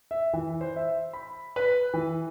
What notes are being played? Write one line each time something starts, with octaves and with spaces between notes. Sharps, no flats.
E5
E3
C5
E5
B5
B4
E3